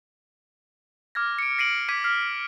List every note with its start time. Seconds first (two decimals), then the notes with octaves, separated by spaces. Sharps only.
1.15 D6 F6 G#6 A#6
1.39 C#7 D7
1.58 A#6 C7 D7 D#7 F#7
1.89 D6 G#6 B6 D#7
2.04 F6 C7